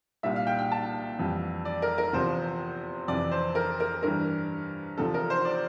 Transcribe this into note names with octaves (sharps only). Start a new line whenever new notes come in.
C2 A#2 G3 E5
F5
G5
G5
A5
F2 E3 G3
D5
A#4
A#4
E2 C3 F3 C5
F2 C3 E3 D5
C5
A#4
A#4
G2 E3 G3 A#4
E2 C3 F3 A4
A#4
C5
D5